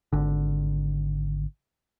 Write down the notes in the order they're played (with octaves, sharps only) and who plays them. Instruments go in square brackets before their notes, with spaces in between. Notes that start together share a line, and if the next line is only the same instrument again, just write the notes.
[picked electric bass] G#1 D3